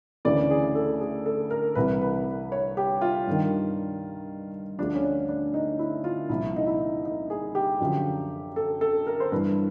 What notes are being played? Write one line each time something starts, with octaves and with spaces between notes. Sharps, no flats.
D2 C#3 E3 D5
G#4
A4
G#4
A4
A#4
C2 C3 E3 B4
B4
C#5
G4
F4
G2 D#3
D2 D3 F3 D4
C#4
D4
D4
D#4
E4
F4
C2 A#2 F3 E4
D#4
E4
D#4
G#4
G4
F#2 D3 F3
A4
A4
A#4
C5
G2 E3 B4